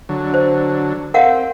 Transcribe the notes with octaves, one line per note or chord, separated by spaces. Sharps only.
D3 F#3
C5
C4 A#4 F5 F#5